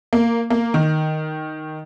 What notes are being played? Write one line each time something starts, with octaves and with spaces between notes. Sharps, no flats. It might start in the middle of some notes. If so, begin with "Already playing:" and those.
A#3
A#3
D#3